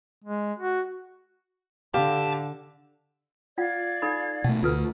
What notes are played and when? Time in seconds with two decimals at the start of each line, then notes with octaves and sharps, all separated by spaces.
0.24 G#3
0.59 F#4
1.94 D3 G4 F5 A5
3.58 F4 D5 F5 F#5 G#6
4.02 D#4 A4 B5
4.44 B2 A3 F#5
4.63 D2 F4 A4 B4